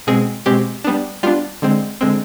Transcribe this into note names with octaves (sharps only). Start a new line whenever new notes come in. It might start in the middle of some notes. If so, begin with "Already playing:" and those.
B2 G#3 C4 G#4
B2 G#3 C4 G4
G3 B3 D4
G3 B3 D4 F4
D3 G#3 C4
D3 G#3 C4